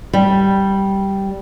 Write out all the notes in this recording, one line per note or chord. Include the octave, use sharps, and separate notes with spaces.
G3